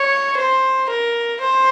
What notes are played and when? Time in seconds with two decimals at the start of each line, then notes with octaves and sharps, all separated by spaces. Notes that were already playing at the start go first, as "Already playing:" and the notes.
Already playing: C#5
0.38 C5
0.90 A#4
1.41 C5